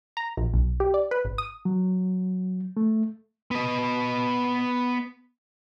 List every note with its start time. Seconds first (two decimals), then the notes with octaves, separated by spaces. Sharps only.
0.17 A#5
0.37 A#1
0.54 B1
0.80 G4
0.94 D5
1.11 B4
1.25 G#1
1.38 D#6
1.65 F#3
2.77 A3
3.51 B3 D#5